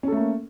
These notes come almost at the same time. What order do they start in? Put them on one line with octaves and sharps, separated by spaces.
C#4 A4 A3 A#3